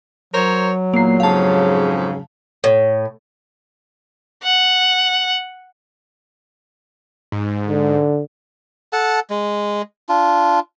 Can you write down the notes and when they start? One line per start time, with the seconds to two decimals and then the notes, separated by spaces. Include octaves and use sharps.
0.34 F#3 A#4 C5 C#5
0.94 E2 A#2 A#3 C7
1.20 F2 G#2 C#3 F5 A5
2.64 A2
4.43 F#5
7.32 G#2
7.68 D3
8.93 A4 F#5 A5
9.30 G#3
10.09 D4 F4